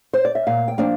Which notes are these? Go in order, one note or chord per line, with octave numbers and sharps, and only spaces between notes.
C5
D5
E5
A#2 F5
G5
F3 A#3 D4